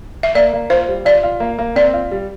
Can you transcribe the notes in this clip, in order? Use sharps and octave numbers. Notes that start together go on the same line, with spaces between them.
E5
A#3 D5
A#3
F4 C5
G3
F4 D5
F4
A#3
A#3
C4 D5
F4
G3